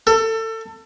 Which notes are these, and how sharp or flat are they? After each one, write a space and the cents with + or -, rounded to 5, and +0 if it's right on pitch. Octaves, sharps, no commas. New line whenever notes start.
A4 +30